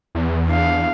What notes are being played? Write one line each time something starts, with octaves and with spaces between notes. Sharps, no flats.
E2
D4 F5